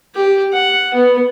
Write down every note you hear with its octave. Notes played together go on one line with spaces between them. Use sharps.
G4
F#5
B3